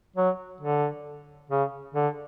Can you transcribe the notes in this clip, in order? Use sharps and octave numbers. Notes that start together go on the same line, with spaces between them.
F#3
D3
C#3
D3